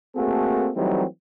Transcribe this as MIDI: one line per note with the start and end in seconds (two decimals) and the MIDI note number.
0.16 0.69 57
0.16 0.69 58
0.16 0.69 60
0.16 0.69 66
0.16 0.69 68
0.16 0.69 69
0.75 1.04 52
0.75 1.04 54
0.75 1.04 55
0.75 1.04 57
0.75 1.04 60
0.75 1.04 63